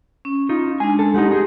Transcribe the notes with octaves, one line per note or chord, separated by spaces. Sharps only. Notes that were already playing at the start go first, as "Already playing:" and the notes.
C#4
D#4 F4
G#3 D4 G#5
A4
G#3 D#4 G4 F#5
D#4 G#4